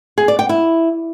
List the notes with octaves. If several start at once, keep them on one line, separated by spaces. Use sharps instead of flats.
G#4
D5
G5
E4